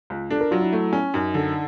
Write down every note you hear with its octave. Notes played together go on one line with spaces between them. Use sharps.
C#2
D4 A4
A#4
F#3 F4
E4
A3
C#4
F#2 D#4
D3